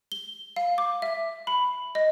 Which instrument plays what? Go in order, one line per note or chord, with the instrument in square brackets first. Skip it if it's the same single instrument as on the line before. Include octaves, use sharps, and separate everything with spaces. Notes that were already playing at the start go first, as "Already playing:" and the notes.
[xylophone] G7
F5
D6
E5
B5
D#5